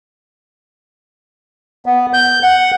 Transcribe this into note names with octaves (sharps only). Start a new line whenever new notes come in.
B3
G6
F#5